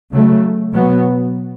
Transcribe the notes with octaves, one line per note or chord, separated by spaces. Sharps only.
C#3 F#3 A3
B2 F#3 B3